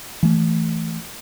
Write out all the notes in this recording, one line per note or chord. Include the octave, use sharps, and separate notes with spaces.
E3 A3